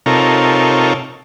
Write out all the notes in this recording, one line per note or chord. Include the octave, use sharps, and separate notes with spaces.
C3 D#4 F4 A4 A#4 C#5